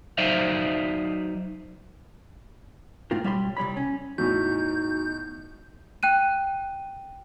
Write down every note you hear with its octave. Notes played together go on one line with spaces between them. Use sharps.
F#3 D#4 C5 D5 E5 F5
G#2 A3 C4 F4 A#4
B1 G3 C#5 E5 B5 C6
C2 G3 C#5 B5
C#4
E2 A2 D#4 F#4 G6
G5 F#6 D#7